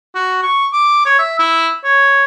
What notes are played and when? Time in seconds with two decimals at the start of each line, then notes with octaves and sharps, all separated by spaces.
0.15 F#4
0.43 C#6
0.73 D6
1.06 C#5
1.19 E5
1.39 E4
1.84 C#5